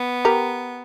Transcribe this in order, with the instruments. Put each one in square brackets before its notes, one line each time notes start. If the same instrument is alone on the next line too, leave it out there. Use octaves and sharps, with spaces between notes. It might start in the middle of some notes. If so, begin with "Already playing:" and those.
Already playing: [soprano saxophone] B3
[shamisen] G4 A#4